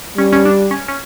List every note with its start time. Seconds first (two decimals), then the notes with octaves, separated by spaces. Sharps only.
0.18 G3 C#4
0.33 C#4
0.45 D4
0.71 C#4
0.88 C#4